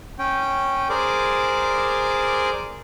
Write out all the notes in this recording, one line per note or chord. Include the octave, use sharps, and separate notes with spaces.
C#4 G5
G#4 A#4 C5 D5 D6